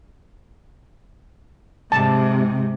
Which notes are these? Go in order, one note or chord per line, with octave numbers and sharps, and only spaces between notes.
G#2 C3 A5